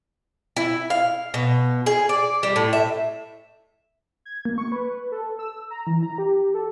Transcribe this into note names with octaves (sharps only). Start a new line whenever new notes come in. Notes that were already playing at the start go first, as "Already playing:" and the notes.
E4
F5
B2
G#4
D5
G3
A2
E5
G#6
A#3
C#6
B4
A4
E6
A#5
E3
A#5
G4
A4